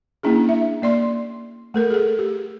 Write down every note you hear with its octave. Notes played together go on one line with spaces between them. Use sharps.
A#3 C#4 D4 E4 G#4
E5
A#3 D5 C6
A3 A4 A#4
G#4 A4
G4